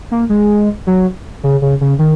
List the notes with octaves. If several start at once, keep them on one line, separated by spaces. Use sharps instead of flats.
A#3
G#3
F#3
C#3
C#3
C#3
D#3